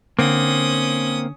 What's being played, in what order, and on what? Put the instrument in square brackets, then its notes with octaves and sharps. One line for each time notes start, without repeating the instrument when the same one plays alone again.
[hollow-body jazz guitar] D3 [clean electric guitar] A#3 C4 [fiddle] C#4 D#6